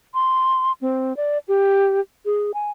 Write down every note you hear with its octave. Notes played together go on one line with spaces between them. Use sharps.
C6
C4
D5
G4
G#4
G#5